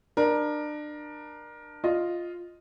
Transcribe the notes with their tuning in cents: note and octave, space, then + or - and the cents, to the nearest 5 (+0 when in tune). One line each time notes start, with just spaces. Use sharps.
D4 +30 A#4 +20
F4 +0 D#5 +0